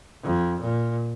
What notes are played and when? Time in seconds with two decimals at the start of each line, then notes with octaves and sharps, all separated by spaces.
0.23 F2
0.61 A#2